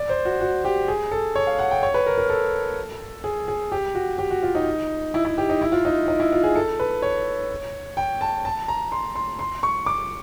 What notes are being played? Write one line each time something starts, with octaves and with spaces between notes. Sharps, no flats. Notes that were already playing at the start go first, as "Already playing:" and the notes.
Already playing: D5
C5
F#4
F#4
G4
G#4
A4
C#5
F5
F#5
G5
C#5
B4
A#4
A#4
A4
G#4
G#4
G4
F#4
G4
F#4
F4
D#4
E4
E4
G4
D#4
E4
F4
D#4
D#4
E4
F4
G#4
A4
B4
C#5
G5
A5
A5
A#5
C6
C6
C6
C#6
D6